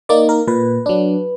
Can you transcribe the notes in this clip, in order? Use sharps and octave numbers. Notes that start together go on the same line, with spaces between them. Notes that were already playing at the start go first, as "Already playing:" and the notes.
A#3 D#4 D5
A#4
A#2 B4
F#3 D4